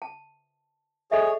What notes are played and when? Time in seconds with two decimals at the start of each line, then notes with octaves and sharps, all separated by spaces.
0.02 A5
1.11 G#4 A4 C#5 D#5 E5